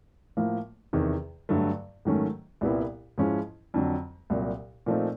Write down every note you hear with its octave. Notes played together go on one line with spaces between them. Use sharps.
A2 F3 A#3
E2 C3 D#3
G2 D3 F#3 A3
G#2 D#3 F#3 A3 C#4
C2 A#2 G3 B3 E4
G#2 F3 G#3 C#4 E4
F2 D3 F#3
C2 A#2 F#3
A#2 F3 A3 C4 D#4